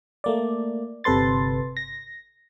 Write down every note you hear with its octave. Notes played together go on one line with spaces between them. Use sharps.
A3 A#3 D5
G1 C3 A4 B4 C6 A6
A#6